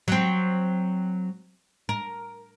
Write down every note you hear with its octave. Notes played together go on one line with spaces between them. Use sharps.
F#3 C4
A#4